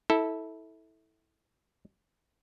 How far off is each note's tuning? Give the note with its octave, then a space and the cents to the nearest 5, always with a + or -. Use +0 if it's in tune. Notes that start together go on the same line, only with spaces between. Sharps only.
E4 -20 A4 +0